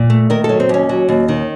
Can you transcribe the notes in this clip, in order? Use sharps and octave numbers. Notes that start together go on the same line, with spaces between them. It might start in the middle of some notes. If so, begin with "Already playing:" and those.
Already playing: A#2
A3
D#3 A#4
A4
F#3
C4
D#2 C#4
F#3
D#2
D#3